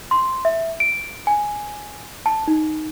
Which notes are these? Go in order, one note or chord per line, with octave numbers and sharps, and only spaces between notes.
C6
E5
D7
G#5
A5
D#4